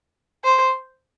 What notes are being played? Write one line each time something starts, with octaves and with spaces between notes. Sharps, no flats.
C5